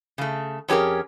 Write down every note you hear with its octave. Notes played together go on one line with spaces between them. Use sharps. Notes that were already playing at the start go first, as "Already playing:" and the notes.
C#3 A3
F2 C#4 G4 G#4 A#4